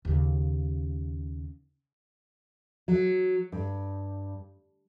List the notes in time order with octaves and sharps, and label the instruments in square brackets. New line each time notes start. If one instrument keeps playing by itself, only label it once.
[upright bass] D#2 C#3
[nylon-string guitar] F#3
G2